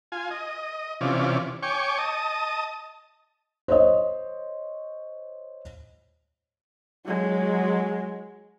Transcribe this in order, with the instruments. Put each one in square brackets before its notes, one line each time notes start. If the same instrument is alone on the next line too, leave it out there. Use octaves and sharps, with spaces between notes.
[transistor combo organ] F4 G#5
D#5
C3 E3 C#4 F4 D5
C#5 G5 G#5 C#6 D6
D#5 A5 D#6
[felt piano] C5 C#5 D#5
[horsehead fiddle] F#3 G#3